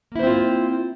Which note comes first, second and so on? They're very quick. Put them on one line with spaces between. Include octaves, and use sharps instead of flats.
A#3 E4 C5 C4 F4